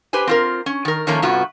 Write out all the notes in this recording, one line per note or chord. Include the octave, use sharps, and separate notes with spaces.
G4 B4 C5 G#5
C4 F4 A#4
C#4
D#3 A#4
D#3 F3 A3 A#3 C#4 A#5
G2 C3 B3 F4 F#4